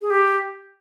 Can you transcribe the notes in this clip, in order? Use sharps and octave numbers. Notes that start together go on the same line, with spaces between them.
G#4
G4